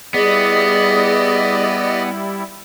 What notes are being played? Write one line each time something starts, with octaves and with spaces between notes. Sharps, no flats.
G3 B3 E4 G#4 D5 D#5